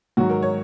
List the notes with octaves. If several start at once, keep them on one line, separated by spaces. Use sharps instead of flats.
G#2 D#3 F#3 F#4
A#4
C#5